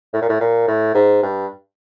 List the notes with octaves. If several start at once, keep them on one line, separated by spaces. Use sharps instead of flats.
A2
A#2
A2
A#2
A2
G#2
G2